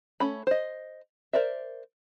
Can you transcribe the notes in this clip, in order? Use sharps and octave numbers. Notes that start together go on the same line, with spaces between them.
A3 C#4 B5
C5 D#5
A#4 C5 D5 E5